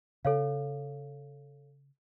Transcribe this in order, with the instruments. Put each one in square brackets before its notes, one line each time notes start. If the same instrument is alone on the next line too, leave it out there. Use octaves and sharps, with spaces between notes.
[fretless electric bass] C#3 [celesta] A4 C#5 F5